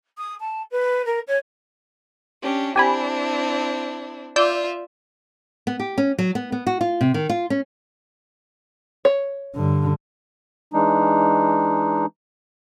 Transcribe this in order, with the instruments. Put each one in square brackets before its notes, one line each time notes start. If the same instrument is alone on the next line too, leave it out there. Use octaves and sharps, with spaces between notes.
[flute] D#6
A5
B4
A#4
C#5
[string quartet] C#4 D4 G4
[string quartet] C4 D4 E4 [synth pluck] G4 G#5 B5
[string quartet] F4 E5 [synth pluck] D5 E6 G6
[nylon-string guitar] B3
G4
C#4
F#3
B3
B3
F#4
F4
C3
D#3
F4
C#4
[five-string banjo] C#5
[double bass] G2 D3
[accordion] E3 G#3 D4 D#4